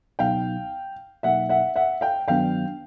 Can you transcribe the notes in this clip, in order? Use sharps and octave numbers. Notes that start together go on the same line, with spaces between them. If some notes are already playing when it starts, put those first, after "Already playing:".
C#2 B2 F#3 B3 D#4 F5 G5
B2 F#3 A#3 D#4 E5 F#5
E5 F#5
E5 F#5
F5 G5
G2 D#3 F#3 B3 D4 F5 G5